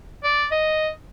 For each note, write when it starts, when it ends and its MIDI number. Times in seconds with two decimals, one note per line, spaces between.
0.24 0.46 74
0.51 0.89 75